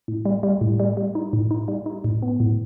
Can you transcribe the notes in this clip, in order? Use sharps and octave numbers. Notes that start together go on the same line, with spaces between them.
A2
G3
G3
A2
G3
G3
D#4
A2
D#4
G3
D#4
A2
B3
A2